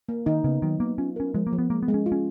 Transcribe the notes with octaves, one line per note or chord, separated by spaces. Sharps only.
A#3
D#3 D#4
C#3 B3
D#3 F#3
A#3 B3
C#4 F4
C#4 A#4
F3 G#3
A#3
F3
B3
G#3 A#3
B3
G#3
C#4
F4
C#4